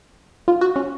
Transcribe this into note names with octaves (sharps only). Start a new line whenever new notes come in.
F4
F#4
C#4